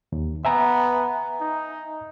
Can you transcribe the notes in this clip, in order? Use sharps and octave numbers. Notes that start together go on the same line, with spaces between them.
D#2
B3 E5 G#5 A#5
D#4